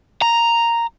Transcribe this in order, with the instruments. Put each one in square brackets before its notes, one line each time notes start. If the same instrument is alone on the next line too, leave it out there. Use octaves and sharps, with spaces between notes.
[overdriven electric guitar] A#5